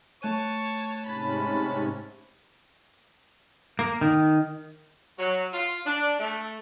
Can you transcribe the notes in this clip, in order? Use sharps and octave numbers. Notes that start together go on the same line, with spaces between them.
A3 C#5 A5 C#6 F#6 D#7
G#2 C3 C#4 A5 B5
A#3
D#3
F#3
F4
D4
A3